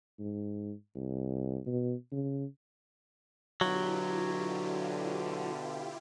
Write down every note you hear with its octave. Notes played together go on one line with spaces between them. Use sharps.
G#2
C2
B2
C#3
B2 D3 F#3 E4 F4 G4